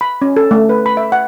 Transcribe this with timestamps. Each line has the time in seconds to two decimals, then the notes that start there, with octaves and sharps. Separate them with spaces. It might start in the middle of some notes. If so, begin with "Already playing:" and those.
0.01 B5
0.22 C#4
0.37 A4
0.51 A3
0.69 B4
0.86 B5
0.97 E5
1.12 F#5